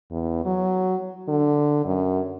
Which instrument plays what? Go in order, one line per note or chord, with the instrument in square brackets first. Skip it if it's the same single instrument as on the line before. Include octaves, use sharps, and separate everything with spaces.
[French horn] E2
F#3
D3
F#2